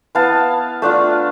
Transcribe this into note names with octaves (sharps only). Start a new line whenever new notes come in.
B3 E4 F5 A5
A3 D4 F4